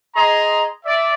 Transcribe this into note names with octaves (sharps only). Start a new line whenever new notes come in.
G#4 D#5 A#5 C6
D5 E5